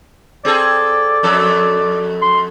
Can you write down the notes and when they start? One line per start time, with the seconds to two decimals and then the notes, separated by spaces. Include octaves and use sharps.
0.45 C4 G#4 A4 D5
1.23 F2 F#3 A4
2.22 C6